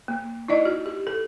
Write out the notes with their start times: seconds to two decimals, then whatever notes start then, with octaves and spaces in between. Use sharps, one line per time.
0.08 A#3
0.48 D#4 E4 D5 D#5
0.65 F#4
0.86 G4
1.07 A4